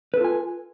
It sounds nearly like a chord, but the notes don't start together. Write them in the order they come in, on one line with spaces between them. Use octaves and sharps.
B4 A4 F4 G#5